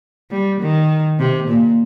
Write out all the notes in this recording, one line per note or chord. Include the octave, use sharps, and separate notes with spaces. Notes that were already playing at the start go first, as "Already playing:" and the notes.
G3
D#3
C3
A#2